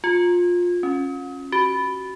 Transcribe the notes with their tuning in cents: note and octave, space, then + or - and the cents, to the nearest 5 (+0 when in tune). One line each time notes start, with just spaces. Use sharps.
F4 +20
C#4 -15
F#4 +30